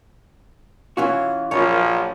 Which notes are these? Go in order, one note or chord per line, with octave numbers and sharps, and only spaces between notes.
E3 C#4 F4 F#4
A#1 F#2 F3 F4 C#5
F#3